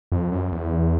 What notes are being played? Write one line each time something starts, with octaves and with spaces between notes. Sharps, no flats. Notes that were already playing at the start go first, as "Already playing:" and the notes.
F2
F#2
E2